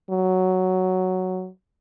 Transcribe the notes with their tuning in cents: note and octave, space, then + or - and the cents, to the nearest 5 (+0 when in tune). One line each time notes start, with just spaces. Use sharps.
F#3 +5